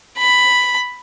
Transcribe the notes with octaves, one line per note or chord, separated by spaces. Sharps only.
B5